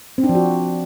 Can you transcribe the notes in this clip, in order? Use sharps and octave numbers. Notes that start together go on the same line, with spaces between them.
C4
D4
F3
F#4